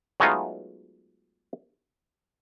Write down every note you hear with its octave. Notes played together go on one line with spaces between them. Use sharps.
F#3 G#3 A3 B3 D#4 F4